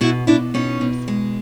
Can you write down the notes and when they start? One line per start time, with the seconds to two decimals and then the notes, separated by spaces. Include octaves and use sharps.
0.01 B2 E4 F#4
0.27 B2 D4 E4
0.54 B2 C#4 D#4
0.81 B2
1.08 G#3